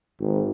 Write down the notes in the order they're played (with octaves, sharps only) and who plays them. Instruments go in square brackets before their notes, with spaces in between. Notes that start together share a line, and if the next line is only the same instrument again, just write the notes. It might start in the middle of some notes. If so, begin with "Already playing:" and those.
[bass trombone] G#1